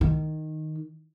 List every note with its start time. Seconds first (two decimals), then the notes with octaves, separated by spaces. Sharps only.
0.01 D#3